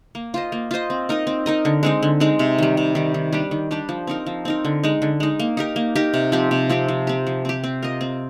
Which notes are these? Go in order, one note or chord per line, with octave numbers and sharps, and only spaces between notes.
A#3
F4 C5 D#5
A#3
F4 C5 D#5
C4
D#4 A#4 D#5
C4
D#4 A#4 D#5
D3
G#3 C4 D#4
D3
G#3 C4 D#4
C3
D#3 G3
C3
D#3 G3
D#3
G3 D4 G4
D#3
G3 D4 G4
F3
C4 D#4 A#4
F3
C4 D#4 A#4
D3
G#3 D#4
D3
G#3 D#4
A#3
D#4 G4 A#4
A#3
D#4 G4 A#4
C3
F3 C4 G4
C3
F3 C4 G4
F3
C4 G4
F3
C4 G4
C4
F4 A#4 D#5
C4